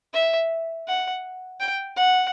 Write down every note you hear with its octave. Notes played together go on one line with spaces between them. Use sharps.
E5
F#5
G5
F#5